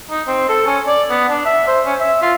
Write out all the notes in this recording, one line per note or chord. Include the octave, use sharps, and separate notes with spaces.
D#4
C4
A4
C#4
D5
B3
D4
E5
C5
C#4
E5
F4